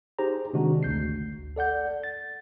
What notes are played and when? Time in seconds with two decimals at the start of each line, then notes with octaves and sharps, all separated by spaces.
0.19 D#4 G4 G#4 C5 A#5
0.53 C3 D#3 G#3 D4 F#4
0.83 G#1 D2 G6 C7
1.56 A4 D5 F#5 G6
2.04 A6